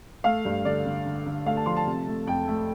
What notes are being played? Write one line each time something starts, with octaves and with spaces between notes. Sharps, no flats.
A3 F5
G2
D3 D5
D3
D3
D3
A3 F5
A5
F3 C6
A5
C3
A3
F2 G5
A3